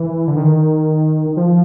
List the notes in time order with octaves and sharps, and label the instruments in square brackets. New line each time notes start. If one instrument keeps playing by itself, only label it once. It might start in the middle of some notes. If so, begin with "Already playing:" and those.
Already playing: [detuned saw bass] E3
D3
D#3
F3